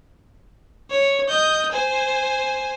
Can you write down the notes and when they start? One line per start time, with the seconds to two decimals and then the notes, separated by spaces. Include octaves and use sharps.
0.91 C#5
1.29 D#5 G6
1.72 C5 G#5